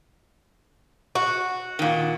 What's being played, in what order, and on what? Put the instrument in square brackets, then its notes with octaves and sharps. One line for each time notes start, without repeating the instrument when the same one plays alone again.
[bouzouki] F#4
[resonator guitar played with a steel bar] A#2 D#3